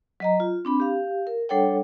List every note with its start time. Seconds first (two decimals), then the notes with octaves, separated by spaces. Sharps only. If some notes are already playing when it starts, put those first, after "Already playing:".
0.20 F#3 D#5 A#5
0.40 F4
0.65 C4 D4 B5
0.80 G4 F5
1.27 A#4
1.49 G3 D4 A4 C#5 F#5 G5